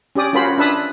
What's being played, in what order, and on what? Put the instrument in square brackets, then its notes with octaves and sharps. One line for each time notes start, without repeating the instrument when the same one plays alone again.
[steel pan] C#4 G4 D5 D#6
C#4 F4 F#4 A#4 C5 B5
D4 B4 E5 A5 B5 D#6